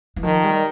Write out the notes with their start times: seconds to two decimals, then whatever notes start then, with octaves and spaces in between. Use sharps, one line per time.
0.16 E3
0.23 D#3 F3
0.44 G3